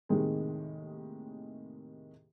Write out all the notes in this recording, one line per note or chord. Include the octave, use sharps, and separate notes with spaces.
D#2 A2 C3 D#3 G#3